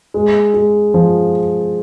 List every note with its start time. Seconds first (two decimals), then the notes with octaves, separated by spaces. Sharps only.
0.14 G#3
0.54 G#3
0.94 F3